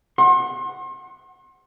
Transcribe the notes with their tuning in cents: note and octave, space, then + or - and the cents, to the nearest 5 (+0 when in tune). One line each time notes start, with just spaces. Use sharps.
F#5 +0 C6 +40